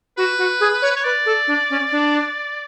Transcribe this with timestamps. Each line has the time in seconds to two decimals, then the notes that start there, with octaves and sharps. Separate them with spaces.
0.17 F#4 B4
0.38 F#4
0.60 G#4
0.82 C#5
0.96 C#5
1.04 B4 D5
1.26 A4
1.47 D4
1.70 C#4
1.92 D4